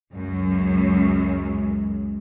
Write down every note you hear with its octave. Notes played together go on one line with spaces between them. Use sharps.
C#2 F#2 G#3